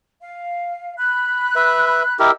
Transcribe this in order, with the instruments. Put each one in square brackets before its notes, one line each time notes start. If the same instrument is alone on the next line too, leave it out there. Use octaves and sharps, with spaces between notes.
[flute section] F5
B5 F#6
[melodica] B4 E5
[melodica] E4 G4 A#4 [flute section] D#5 E6